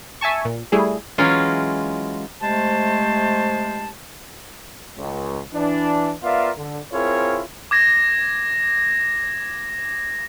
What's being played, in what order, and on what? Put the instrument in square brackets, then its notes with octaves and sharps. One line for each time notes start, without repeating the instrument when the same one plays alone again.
[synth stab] E5 G#5 A5 C#6
A#2
G3 A3 E4 G#4
[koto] E3 F#3 G#3 C#4 F4
[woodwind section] C3 G#3 A3 C5 A5
[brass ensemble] C#2
E3 D4
B3 F4 A#4 D5 E5 F5
D3
C4 E4 F4 G#4 A#4 C#5
[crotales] D6 G#6 A#6